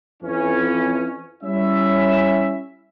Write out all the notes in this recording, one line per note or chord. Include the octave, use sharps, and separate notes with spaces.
F2 E3 C#4
G3 C#4 E4 E5